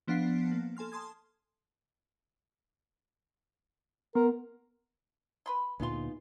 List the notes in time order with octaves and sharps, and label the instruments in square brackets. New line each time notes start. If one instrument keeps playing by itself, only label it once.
[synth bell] F3 B3 D4 F5 F#5 C7
A#3
A4 G#5 C6 F6
A5 C6 D#6 G#6
[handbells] B3 [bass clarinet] A#4
[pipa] B4 B5 C6
[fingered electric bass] D2 A#2 [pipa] G#3 C6 [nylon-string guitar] B3 D#4 F4